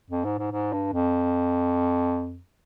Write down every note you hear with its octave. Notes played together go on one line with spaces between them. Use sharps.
F2
G#2
G#2
G#2
G2
F2